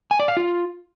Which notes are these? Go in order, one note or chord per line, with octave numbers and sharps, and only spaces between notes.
G#5
D5
F5
F4